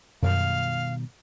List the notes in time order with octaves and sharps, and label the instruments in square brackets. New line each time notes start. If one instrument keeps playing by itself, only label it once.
[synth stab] F#2 [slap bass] B2 D#3 G3 [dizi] F5